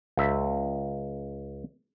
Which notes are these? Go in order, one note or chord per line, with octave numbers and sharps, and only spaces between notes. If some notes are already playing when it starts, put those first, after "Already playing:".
C#2 E5